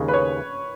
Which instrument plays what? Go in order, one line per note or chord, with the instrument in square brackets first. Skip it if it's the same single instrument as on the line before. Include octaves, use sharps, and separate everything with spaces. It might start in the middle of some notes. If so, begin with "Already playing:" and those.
Already playing: [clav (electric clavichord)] D#2 C#3 G#3
[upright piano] B4
C#5